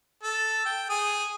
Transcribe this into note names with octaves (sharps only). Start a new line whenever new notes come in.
A4
G5
G#4 D#6